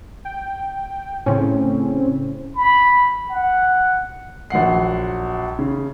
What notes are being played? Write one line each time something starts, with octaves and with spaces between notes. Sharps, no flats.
G5
A2 C#3 C4 C#4
B5
F#5
A#1 F#3 F#5 C7
C#3